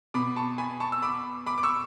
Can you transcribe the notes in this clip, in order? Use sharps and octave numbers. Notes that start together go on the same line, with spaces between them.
B2 B5 D6
A5 C#6
G#5 B5
A5 C#6
E6
B5 D6
B5 D6
D6
C#6 E6